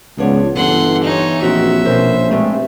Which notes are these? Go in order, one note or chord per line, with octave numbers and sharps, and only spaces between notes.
C#2 F3 B3 D4 C#5
G1 D3 E3 F#5 C6
D#4 C#5
A#1 C4 F#4 E5
F2 B2 C#4 A#4 C5
G2 G#3 A3 C4